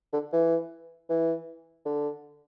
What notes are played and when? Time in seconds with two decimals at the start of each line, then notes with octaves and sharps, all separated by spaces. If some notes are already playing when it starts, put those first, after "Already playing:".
0.13 D3
0.32 E3
1.10 E3
1.86 D3